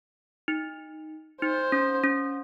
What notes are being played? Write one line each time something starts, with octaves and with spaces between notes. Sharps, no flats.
D#4
D#4 C5
C#4
C#4